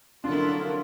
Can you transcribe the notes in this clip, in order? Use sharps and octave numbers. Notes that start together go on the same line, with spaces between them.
D3 F3 F#3 D4 E4 F4 A4 A#4